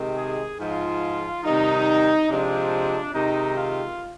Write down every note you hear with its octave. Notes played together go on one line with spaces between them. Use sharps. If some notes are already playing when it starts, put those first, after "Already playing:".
Already playing: C3 D#3 G#3
G#4
G#2 F3 G#3 F4
C3 D#3 G3 D#4
C3 F3 G#3 D4
C3 D#3 G#3 D#4
F4